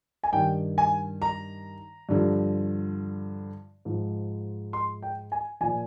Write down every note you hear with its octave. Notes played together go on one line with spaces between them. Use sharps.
G#5
G2 D#3 G5
G#5
A#5
G2 D3 F3
G#2 F3
C6
G5
G#5
A#2 F3 G#5